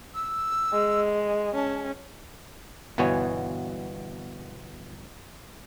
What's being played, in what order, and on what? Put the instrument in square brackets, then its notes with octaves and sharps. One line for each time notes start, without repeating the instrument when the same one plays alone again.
[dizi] E6
[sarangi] G#3
[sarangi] C#4 [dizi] A5
[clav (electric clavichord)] G1 B2 E3 B3 C#5 G#5